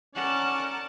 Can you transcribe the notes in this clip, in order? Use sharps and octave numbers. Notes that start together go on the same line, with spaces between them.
C#4 A#4 D5 F#5 A5 D6